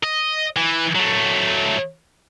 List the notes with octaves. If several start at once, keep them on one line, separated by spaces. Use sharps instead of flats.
D#5
E3
F#3 A3